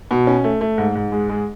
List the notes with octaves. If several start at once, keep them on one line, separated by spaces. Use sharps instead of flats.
B2
C#4
A3
A3
G#2
G#2
G#3
G#3